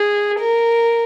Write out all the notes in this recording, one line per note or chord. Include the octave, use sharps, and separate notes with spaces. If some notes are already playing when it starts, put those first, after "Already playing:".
Already playing: G#4
A#4